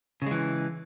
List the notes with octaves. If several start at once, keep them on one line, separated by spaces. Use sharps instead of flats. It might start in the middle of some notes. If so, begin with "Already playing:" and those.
C#3 E3 G#3